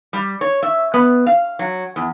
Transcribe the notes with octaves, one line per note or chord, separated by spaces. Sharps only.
G3
C#5
E5
B3
F5
F#3
E2